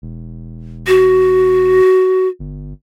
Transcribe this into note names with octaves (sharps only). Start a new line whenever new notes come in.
E1
F#4
G1